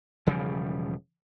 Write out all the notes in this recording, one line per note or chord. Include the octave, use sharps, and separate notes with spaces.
E1 C#3 F3 G3